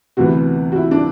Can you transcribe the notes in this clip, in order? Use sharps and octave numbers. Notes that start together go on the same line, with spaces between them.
D2 C3 E3 B3 F#4
F#4
E4
D4